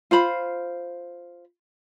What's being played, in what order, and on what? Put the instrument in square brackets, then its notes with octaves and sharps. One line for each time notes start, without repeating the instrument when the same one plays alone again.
[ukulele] F4 C5 B5